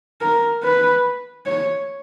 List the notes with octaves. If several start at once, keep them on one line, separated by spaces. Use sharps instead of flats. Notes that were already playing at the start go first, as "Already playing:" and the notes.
A#4
B4
C#5